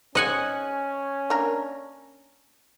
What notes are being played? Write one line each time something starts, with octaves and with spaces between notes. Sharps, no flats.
C4 C#4 D#4 G#4 D#5 F#5 G#5
A#3 D4 A#4